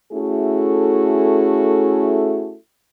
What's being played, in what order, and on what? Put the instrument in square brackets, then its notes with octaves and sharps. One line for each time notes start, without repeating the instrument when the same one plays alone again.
[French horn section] A3 C#4 E4 F#4 G#4 A4